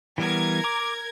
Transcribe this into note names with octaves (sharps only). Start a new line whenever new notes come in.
E3 G3 B3 A#4 G#6
A#5 D6